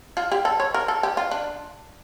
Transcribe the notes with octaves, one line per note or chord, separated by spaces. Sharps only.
F4
G4
A4
C#5
A#4
A4
G4
F4
D4